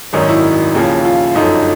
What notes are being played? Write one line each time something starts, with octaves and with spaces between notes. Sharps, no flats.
G#1 F#2 D#3 F#3 D#4
E4
D#2 C#3 F3
F4
G1 F#2 D3 F3 D#4